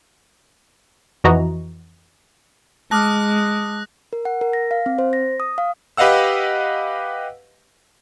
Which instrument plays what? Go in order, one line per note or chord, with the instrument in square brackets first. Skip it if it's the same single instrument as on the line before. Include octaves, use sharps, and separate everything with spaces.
[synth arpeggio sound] F2 E3 F#4 D#5 A#5
[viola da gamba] G#3 [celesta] A5 D6 F6 [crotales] D#6 F#6 A#6
[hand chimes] A#4
F#5
A#4
A#6
F5
C4
C5
A#6
D#6
F5
[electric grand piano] G4 B4 D#5 F5 F#5 E6